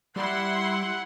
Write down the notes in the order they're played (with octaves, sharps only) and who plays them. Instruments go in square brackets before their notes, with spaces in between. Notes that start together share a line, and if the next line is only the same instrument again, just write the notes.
[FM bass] G3 [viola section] E4 C6 [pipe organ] F#5